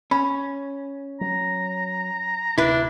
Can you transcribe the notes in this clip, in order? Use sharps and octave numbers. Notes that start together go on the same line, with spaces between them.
C#4 B5
F#3 A#5
D1 C3 D4 E4 B4